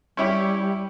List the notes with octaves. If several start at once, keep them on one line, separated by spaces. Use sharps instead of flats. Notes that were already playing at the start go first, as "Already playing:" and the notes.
G3 C#4 E4 G4